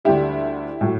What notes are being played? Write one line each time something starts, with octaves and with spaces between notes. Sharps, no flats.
D2 D3 G3 E4 G4
A2 F#3